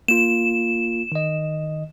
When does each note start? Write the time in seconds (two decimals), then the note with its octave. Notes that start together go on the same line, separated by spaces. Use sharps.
0.08 A#3 F4 E7
1.12 D#3 D#5